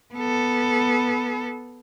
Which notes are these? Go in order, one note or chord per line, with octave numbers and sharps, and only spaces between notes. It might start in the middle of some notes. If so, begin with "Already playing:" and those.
B3 A4